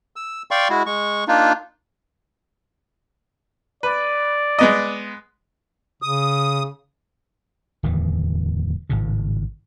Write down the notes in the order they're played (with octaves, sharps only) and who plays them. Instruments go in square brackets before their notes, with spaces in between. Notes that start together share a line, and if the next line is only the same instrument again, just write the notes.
[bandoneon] E6
D5 F5 G5 C6 C#6
G#3 E4 F#4
G#3 C#6
A#3 D4 D#4 F4
[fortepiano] B4 [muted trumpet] D5
[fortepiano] G#3 B3 D#5
[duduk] C#3 [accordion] D#6
[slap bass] D1 E2 D#3 E3
G#1 A2 C#3